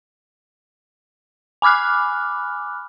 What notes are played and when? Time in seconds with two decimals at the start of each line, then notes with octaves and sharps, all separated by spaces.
1.62 G#5 B5 D6 F6 F#6